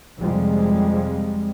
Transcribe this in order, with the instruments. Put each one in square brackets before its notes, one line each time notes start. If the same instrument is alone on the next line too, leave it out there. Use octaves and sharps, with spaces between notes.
[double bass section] F2 C3 F3 G3 G#3